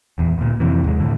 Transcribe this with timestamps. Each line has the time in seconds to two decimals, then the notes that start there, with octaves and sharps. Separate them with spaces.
0.18 D#1 E2
0.38 D2 A#2
0.60 F2 C3 E3
0.84 D#2 G#2 G#3
1.00 D#2 A2 D3